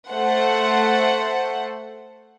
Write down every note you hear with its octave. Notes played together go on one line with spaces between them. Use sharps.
A3 C5 F#5